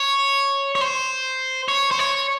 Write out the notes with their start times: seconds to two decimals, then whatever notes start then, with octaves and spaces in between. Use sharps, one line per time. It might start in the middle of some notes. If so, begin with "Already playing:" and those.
Already playing: C#5
0.75 C#5
0.81 C5
1.68 C#5
1.91 C5
1.99 C#5